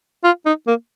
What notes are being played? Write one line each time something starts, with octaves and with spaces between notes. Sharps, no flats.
F4
D#4
A#3